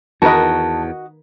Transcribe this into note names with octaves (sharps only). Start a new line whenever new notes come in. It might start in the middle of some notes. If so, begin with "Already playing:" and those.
E2 D#3 F#4 A#4 B4 D#5 A5